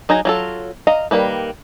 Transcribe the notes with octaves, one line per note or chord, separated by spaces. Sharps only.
F#3 D#4 G#4 A#5
F#3 F4 A4
D#5 F5 A#5
D#3 F#3 G3 A#3 B4